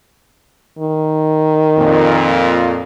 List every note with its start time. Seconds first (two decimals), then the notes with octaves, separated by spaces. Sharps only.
0.79 D#3
1.78 F2 A#2